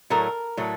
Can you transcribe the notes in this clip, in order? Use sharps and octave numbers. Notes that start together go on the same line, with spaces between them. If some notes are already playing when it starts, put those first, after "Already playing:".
A2 F#3 A3 A#4
A2 F#3 A3